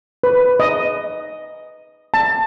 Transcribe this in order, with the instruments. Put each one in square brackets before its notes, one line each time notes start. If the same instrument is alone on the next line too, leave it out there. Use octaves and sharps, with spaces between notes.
[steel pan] B4
D#5
A5